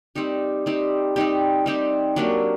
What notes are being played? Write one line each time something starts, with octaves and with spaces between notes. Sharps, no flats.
G3 C4 D#4 G4
G3 C4 D#4 G4
G3 C4 D#4 G4
G3 C4 D#4 G4
F#3 A#3 D4 G4